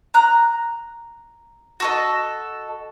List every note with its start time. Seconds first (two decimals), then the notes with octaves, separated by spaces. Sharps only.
0.14 A#5 F#6
1.80 F#4 A4 D#5